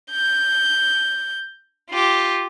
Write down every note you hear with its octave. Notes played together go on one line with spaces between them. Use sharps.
G6
F4 G4